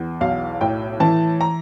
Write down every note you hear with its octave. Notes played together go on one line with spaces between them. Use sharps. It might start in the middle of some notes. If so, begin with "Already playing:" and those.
Already playing: E2
B1 F5
A2 G5
E3 A5
A#5